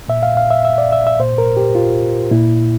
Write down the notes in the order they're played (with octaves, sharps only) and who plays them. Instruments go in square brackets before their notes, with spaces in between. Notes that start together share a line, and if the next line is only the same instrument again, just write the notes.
[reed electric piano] A#2 E5
F5
F5
E5
E5
D5
E5
E5
A#2 C5
A#4
G4
F4
A#2 E4